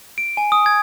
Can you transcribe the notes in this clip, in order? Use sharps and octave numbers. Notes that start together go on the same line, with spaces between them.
D7
G#5
D#6
G#6